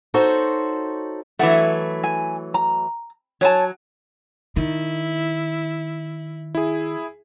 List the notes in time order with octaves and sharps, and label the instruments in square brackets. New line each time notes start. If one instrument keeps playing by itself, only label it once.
[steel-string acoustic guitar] D#4 F#4 A4 C5 C#5
[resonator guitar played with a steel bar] E3 F#3 A3 [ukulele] F#5
[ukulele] G#5
A#5
[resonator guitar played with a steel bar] F#3 [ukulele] C#5 G#5 A5
[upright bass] D#3 [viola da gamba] E4
[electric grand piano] E4 G#4